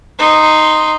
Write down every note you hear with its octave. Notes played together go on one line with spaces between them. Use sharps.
D#4 C6